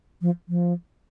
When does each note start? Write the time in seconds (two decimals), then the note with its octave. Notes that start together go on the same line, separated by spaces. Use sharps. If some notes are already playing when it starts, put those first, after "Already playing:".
0.22 F3
0.49 F3